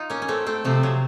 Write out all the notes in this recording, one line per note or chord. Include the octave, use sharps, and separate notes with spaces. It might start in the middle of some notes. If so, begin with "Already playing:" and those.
Already playing: D#4 F4
A#3 C#4
C#4
A3 C4
A3 C4
C3 F3 A3
F#3